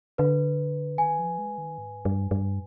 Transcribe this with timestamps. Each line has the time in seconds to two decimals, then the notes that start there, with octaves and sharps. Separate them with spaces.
0.18 D3 B4
0.98 D#3 G#5
1.19 F3
1.38 G#3
1.58 D#3
1.78 G#2
2.05 G2
2.31 G2